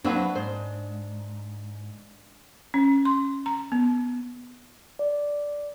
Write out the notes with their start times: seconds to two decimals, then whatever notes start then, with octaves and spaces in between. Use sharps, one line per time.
0.04 F#3 A#3 C4 D4 F#4 B4
0.35 G#2 C5
2.74 C#4
3.05 C6
3.46 A#5
3.72 B3
4.99 D5